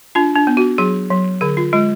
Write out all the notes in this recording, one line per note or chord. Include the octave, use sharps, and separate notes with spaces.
D4 F4
D4
B3
F#4
F#3 G#4
F#3
D3 G#4
F4
G#3 F4